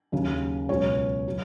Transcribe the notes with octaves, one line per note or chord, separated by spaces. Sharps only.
D#2 C#3 F#3
C#2 B2 F#3 C#5
F#3